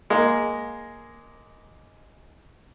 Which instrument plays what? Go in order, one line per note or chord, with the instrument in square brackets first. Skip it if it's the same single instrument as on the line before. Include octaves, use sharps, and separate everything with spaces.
[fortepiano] G#3 A#3